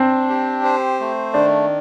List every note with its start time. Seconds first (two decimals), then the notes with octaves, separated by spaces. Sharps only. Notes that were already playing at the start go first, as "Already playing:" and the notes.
Already playing: C4 D4
0.29 G4
0.64 C5
1.00 A3
1.34 D#3 D4